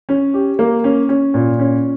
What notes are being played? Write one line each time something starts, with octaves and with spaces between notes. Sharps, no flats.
C#4
G4
A#3
C#4
C#4
A#2
C#4